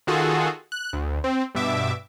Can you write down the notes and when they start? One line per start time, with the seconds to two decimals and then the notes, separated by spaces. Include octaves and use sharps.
0.07 D#3 F4 F#4 G#4 A4
0.72 F#6
0.93 D2
1.24 C4
1.55 G2 B2 E5 D6